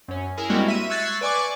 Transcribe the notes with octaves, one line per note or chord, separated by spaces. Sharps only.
F#2 C#4
E4 G#4 A#4
G3 G#3 A#3 C4 E4 F#4
E5 D#7
C#6 E6 F#6 G#6 A6 C7
B4 D5 G#5 C#6 D6